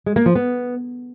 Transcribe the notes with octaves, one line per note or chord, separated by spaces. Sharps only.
G#3
A#3
F3
B3